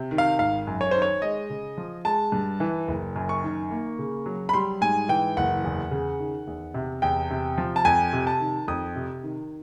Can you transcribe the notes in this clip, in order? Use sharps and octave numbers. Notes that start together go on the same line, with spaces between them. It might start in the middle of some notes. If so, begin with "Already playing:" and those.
Already playing: C3
D#3
F5
G#1 F5
F#2
C#5
D#3 C5
C#5
G#3 D#5
C#3
F3
G#3 A5
G2
E3
F#1
F#2
C#6
D#3
A#3
C#3
F#3
B5
G3 C6
G#2 G#5
E3 G5
F#1 F#5
E2
C#3
D#3
E2
C3
E2 G5
C3
F3
A5
F2 G#5
C3
A5
D#3
F2 D#6
C3
D#3